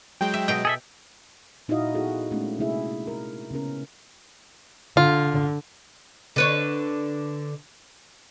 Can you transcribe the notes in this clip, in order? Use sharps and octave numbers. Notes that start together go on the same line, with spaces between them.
F#3 G#3 G5
E5
B2 D#5 G5
G#4 A4 E5
A#2 D#4 E4 F#4 D#5 F5
B3 E4 F#4 G#4 A4
G#3 A3 B3 C#4 D4
C3 G#3 A#3 E4 G#4 E5
A#4
C#3 B3 C#4 A#4
D3 F4
D3 B4 C#5